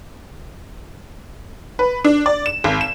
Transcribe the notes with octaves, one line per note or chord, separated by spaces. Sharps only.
B4
D4
D5
E7
G#1
E7